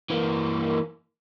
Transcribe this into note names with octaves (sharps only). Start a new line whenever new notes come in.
E3 A#3